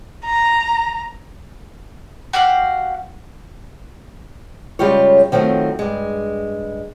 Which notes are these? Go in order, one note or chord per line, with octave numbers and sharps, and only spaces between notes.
A#5
F#4 G4 F5 F#5
C#3 G3 G#3 F4 G4 C#5
D#3 F3 F#3 A3 C4
G2 G#3